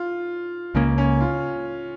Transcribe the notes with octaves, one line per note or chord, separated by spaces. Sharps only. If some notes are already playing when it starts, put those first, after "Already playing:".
Already playing: F4
C#2 C#3 A#3 C#4
C#4
F4